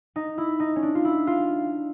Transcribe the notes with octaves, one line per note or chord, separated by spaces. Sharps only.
D#4
E4
D#4
C#4
D4
F4
E4
F4